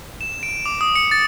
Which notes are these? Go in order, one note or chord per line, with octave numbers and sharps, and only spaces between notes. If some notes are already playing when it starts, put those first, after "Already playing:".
E7
D7
D6
D#6
C#7
A6